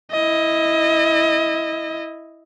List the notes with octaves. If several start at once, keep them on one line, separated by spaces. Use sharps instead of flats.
E4 D#5